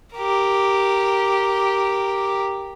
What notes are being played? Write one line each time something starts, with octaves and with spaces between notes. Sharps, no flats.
G4 A#4